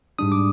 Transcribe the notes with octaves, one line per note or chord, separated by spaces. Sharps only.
G#2 G3 D4 D#6
D6